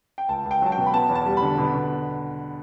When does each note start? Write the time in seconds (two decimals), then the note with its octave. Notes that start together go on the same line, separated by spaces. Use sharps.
0.18 G5
0.29 C#2 A5
0.45 C#2
0.51 G5
0.62 F#3 A5
0.72 G5
0.78 B2
0.86 B5
0.94 B3 A5
1.09 E2
1.15 A5
1.26 G3
1.37 B5
1.42 D3
1.58 B2
1.74 B2